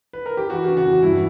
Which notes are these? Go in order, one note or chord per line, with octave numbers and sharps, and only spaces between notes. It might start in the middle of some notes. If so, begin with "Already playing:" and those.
B4
A#4
G4
E3 F#4
C#3
F#4
E2
G2 E4